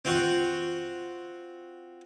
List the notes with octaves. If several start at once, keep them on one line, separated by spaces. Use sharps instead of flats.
C4 F4 F#4